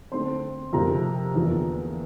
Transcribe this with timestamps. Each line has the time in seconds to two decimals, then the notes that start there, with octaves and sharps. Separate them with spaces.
0.12 D3 A3 C4 C5 C6
0.73 F2 C3 F3 A3 A#4 A#5
1.35 E2 D3 F3 A#3